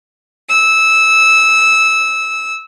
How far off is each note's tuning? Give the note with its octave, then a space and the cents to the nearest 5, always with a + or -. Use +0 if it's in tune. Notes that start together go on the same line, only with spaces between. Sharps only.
E6 -15